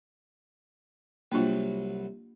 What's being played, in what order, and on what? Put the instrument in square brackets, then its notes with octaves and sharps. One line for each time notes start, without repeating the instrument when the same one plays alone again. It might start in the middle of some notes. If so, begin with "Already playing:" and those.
[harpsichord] C2 F#3 B4 [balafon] A#3 D4 F4